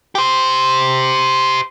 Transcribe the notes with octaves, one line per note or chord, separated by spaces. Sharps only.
G4 C5